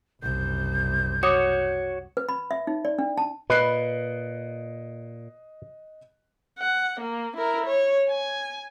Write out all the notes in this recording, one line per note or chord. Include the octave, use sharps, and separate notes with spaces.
F#1 C2 G6
F#4 C#5 D6 D#6
B4
B5
E5
D#4
D5
D4
A5
A#2 B4 D#5 F#6 C7
F#5
A#3
E4 A#4
C#5
G#5